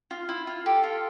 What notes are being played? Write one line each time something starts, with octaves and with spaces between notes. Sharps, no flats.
F4
E4
F4
G4 A4
F4